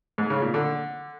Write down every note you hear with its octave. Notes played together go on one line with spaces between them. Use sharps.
G#2
C#3
A#2
D3